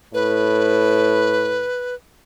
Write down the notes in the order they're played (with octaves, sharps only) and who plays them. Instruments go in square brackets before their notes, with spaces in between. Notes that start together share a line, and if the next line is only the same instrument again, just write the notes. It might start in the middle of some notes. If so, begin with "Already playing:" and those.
[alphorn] A2 [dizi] B4